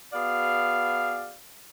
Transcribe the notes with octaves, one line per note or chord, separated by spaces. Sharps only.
B3 F#4 G#4 D5 F5